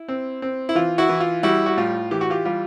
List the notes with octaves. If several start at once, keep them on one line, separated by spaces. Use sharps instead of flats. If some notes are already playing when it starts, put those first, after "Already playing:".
Already playing: E4
C4
C4
E4
E3 F4
E4 F#4
E3
F4
G3 E4 F#4
F#4
A2 F4
E3 G4
F#4
F4 G4
G3 F4